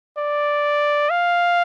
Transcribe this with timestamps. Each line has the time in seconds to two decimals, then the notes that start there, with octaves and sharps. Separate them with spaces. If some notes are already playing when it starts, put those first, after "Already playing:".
0.18 D5
1.10 F5